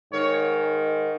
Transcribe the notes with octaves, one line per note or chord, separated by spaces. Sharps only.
G#2 D#3 C#5